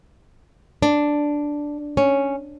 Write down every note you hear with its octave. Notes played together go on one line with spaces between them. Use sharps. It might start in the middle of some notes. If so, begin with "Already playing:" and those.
D4
C#4